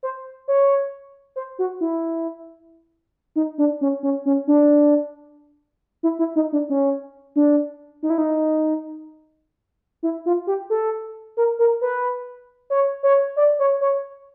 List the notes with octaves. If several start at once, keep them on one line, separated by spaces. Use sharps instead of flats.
C5
C#5
C5
F#4
E4
D#4
D4
C#4
C#4
C#4
D4
E4
E4
D#4
D4
C#4
D4
D#4
E4
D#4
E4
F4
G4
A4
A#4
A#4
B4
C#5
C#5
D5
C#5
C#5